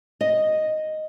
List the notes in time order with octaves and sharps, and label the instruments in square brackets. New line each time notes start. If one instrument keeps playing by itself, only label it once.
[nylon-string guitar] D#5